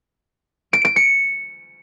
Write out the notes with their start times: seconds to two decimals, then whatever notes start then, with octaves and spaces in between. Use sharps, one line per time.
0.73 D7
0.85 D7
0.96 C#7